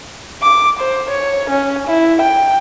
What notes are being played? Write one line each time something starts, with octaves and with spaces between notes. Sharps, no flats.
D6
C5
C#5
C#4
E4
G5